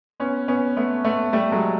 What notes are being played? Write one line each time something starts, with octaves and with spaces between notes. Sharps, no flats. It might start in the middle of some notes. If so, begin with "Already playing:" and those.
B3 C#4
B3 C#4
A3 B3
A3 B3
G3 A3
F#3 G#3